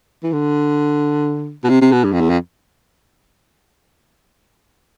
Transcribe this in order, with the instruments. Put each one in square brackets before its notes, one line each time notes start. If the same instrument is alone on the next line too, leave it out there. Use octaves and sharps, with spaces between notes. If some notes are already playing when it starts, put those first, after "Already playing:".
[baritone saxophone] E3
D3
B2
C3
C3
B2
G2
F2
E2
F2